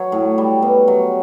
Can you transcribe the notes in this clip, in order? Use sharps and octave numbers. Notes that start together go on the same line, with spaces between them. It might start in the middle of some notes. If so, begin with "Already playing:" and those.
Already playing: F#3 C#5
A2
G3
B2
F#3